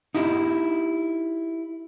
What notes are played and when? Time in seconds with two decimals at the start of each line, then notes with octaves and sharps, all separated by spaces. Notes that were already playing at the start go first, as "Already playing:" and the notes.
0.15 D#4 E4 G4